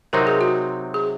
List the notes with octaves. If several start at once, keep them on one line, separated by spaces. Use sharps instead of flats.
C3 F#3 C4 D#4 A#4
G#4
F#4
G#4